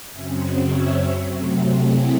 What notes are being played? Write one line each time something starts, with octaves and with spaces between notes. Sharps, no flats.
F#2 C#3 F#3 C4 E5 G#5
D#5 F#5
C#5 E5
C3 F#3 A3 C4
E4 G#4